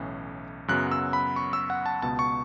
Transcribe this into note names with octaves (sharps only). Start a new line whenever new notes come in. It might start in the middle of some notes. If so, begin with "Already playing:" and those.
Already playing: B1 A2 E3 C#4
F#2 C#3 F#3 B3 F#6
E6
B5
C#6
E6
F#5
A5
C#2 B2 B3 A5
C#6